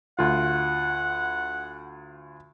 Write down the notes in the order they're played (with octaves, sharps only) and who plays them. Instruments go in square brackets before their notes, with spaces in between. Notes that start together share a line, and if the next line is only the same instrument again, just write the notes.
[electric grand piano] D2 F4 [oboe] F#5